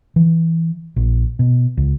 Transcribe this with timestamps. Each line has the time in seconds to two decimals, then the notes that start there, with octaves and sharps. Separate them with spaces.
0.16 E3
0.96 A#1
1.39 B2
1.77 C#2